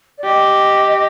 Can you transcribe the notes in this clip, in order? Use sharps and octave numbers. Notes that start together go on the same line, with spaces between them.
D5
G4 D#5